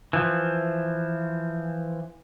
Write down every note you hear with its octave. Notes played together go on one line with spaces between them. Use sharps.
E3 F3